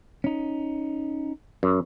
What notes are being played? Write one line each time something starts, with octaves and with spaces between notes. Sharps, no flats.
C#4 D#4
F#2